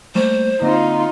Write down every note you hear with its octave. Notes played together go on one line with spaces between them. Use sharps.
G3 A3 A#3 C5
D3 A#3 C4 D#4 F4